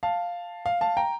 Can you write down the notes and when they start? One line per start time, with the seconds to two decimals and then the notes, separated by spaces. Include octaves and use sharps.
0.03 F5 A5
0.66 F5
0.81 F5 A5
0.97 G5 A#5